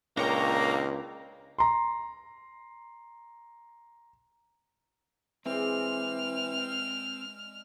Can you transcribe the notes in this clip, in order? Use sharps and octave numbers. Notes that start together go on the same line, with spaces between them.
C#2 A#2 A#3 D4 C#5 G5 A#5
A#5 C6
E3 G#3 C4 D5 F6